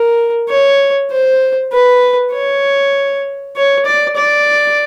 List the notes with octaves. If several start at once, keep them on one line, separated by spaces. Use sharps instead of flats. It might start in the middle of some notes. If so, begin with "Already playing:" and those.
Already playing: A#4
C#5
C5
B4
C#5
C#5
D5
D5